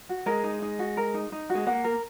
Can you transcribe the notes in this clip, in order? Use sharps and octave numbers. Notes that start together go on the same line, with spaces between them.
F#4
G#3 A#4
D#4
D#4
F#4
A#4
D#4
D#4
F#4
G#3
A#3 F#5
A#4